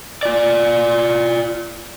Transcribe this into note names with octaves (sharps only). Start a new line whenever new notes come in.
F4 D5